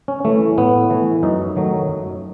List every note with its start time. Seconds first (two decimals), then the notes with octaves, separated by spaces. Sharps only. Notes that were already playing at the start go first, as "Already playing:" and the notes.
0.08 C#4
0.25 E3 A3
0.58 A2 B3
0.90 E3 A3
1.23 F#2 D#4
1.56 D#3 F#3 A3
1.88 F#2